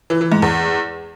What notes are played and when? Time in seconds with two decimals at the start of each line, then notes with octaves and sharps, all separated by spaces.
0.10 E3
0.21 E3
0.32 G#2
0.42 E2